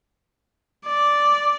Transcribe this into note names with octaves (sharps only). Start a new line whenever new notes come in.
D5